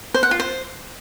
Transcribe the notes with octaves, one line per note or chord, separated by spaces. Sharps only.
C5
F#5
F4
C5